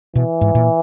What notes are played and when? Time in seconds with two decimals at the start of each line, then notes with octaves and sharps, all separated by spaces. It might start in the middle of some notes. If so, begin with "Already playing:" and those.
0.15 B2 E3
0.41 G#2
0.55 A#2